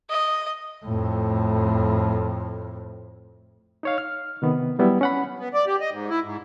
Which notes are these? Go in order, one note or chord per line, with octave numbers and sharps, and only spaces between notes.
D#5
F2 A2
D#4 C#5 F5
F6
C3 D#3 B3
F#3 G3 B3 E4
C#4 F#5 B5
B3
D5
G4
D#5
G#2
E4
G#2